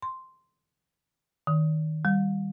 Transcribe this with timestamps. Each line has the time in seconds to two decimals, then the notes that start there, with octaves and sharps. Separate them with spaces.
0.02 C6
1.47 D#3
2.05 G3